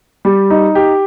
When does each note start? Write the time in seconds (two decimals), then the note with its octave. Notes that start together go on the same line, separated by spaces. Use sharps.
0.25 G3
0.50 D#4
0.75 G4